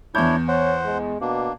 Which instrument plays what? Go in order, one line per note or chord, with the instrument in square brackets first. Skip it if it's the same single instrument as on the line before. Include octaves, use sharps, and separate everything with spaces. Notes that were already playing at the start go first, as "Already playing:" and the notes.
[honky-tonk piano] E2 G6 [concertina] D4 E4 C#5
[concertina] C5 F#5 [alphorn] C#5
[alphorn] G#3
[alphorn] B2 [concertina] A#3 D4